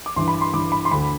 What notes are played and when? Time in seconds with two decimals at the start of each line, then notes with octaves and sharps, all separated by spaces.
0.06 D6
0.16 G2 E3 C6
0.28 B5
0.41 C6
0.54 G2 E3 D6
0.72 B5
0.85 C6
0.91 D2 D3 B5